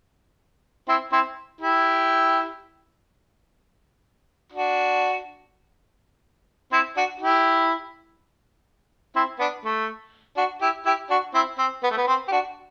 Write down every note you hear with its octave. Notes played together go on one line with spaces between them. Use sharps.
C4 E4
C4 E4
E4 G4
D4 F#4
C4 E4
D4 F#4
E4 G4
C4 E4
B3 D4
A3
D4 F#4
E4 G4
E4 G4
D4 F#4
C4 E4
C4
B3
A3
B3
C4
G4
D4 F#4